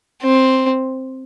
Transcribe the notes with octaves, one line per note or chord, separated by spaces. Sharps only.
C4